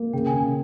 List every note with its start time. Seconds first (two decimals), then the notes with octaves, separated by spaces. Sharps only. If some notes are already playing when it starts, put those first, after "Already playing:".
Already playing: A#3
0.13 C#3 G5
0.27 G#5
0.33 C#3